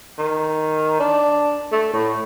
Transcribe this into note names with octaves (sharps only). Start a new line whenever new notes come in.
D#3
D4
A3
A2